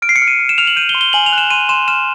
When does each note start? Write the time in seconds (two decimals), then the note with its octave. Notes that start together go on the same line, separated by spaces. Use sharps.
0.02 F6 D7
0.09 C7
0.16 C#7
0.22 F6
0.28 D#7
0.39 F6
0.49 E7
0.58 F6 F7
0.67 F#7
0.76 G6 D#7
0.89 G7
0.95 C6
1.01 G7
1.13 G#5 F#7
1.26 F7
1.33 F#6
1.38 E7
1.50 C6 D#7
1.69 C6 E7
1.88 F6 E7